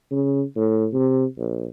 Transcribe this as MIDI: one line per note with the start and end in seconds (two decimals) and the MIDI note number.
0.11 0.42 49
0.56 0.87 45
0.93 1.25 48
1.38 1.67 34